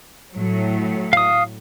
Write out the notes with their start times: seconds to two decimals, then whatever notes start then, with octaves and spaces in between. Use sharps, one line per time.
0.34 A2 F#3
1.13 F5 D#6